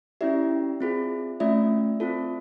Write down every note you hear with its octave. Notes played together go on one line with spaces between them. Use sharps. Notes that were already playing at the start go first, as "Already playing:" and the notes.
C#4 E4 G4 D5 E5
C4 F4 G#4
A3 C#4 F4 D5 E5
C4 F4 A4